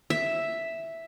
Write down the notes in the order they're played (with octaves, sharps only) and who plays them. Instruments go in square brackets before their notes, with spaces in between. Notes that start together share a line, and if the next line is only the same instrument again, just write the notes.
[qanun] E5